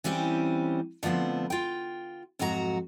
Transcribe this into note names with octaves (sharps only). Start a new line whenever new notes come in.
E3 G3 C4 C#4 G4
D3 F3 A3 B3 C4
F4 G5
F2 G#2 F#3 F#4 A#5